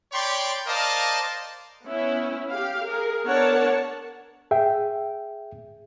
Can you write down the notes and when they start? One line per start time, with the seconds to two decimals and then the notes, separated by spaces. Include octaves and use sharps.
0.12 C#5 D5 G5 B5 C6
0.67 A#4 C5 D5 D#5 F5 A5
1.85 B3 C#4 E4
2.51 G4 F5
2.86 G#4 A#4
3.24 B3 D4 A#4 C#5 F#5 A5
4.51 G#4 E5 G5